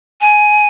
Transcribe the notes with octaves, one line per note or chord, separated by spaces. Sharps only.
G#5